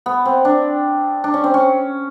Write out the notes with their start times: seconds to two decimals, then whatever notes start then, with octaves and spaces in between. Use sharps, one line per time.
0.06 B3
0.25 C4
0.45 D4
1.24 D4
1.34 C#4
1.44 C4
1.54 C#4